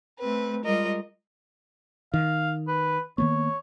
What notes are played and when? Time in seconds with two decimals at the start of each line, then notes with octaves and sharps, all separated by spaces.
0.20 A3 C4 B4
0.65 G3 G#3 F4 A#4 D#5
2.14 D#3 F5
2.68 B4
3.18 D#3 A#3 B3 C#5